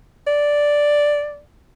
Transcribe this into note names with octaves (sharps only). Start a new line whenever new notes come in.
D5